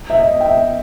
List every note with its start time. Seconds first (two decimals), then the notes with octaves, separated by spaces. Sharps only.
0.10 E5
0.19 D#5
0.40 G5
0.46 E5